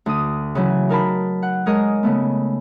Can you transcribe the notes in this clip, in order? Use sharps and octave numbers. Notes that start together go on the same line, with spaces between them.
D2 D#6
C#3 E3 F#3 E4
D#4 A#4 A5 B5
F#5
G#3 G#4 A#4 C#5 D#5
C#3 A3 B3